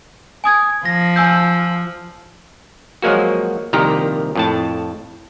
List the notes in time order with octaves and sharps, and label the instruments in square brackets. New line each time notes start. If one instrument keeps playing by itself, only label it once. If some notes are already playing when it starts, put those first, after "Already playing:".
[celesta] G#5 D#6 G#6
[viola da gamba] F3 [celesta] A#6
[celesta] G#5 E6 G6
[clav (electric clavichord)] F3 F#3 G#3 A#3 F#4
C2 A#2 D#3 F3 G4 A#5
F2 A2 A5